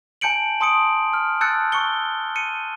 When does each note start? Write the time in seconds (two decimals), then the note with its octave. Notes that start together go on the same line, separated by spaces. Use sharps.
0.21 G#5 A5 G6 C#7 D7 F#7
0.60 A5 C6 D#6 C#7 D7
1.13 F6
1.41 A5 E6 F#6 G6 A6 C#7
1.72 C#6 E6 C#7 G7
2.36 C#7 D#7